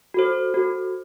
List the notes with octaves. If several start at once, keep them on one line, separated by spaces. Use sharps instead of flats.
F#4 A4 C5
F#4 A4 C5